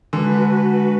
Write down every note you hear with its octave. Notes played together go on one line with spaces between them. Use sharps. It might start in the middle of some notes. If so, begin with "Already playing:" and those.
D3 G#3 F#4 B4